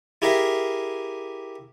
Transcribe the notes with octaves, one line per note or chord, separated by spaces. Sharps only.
E4 G4 G#4 A#4 E5 F5